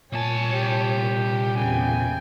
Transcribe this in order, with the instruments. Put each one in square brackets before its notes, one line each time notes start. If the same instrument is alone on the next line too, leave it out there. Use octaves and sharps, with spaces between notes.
[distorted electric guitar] C2 A5 [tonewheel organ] A#2 [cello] C#5 [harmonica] G#5
[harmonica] G4
[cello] E2 C#3 [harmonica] G5 G#5